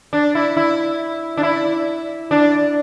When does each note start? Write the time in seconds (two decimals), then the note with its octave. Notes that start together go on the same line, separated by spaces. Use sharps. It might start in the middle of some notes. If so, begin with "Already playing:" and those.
0.13 D4
0.35 E4
0.57 E4
1.37 D4
1.43 E4
2.31 D4